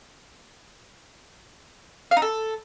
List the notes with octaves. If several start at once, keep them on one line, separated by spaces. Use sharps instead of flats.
F5
D#4
A4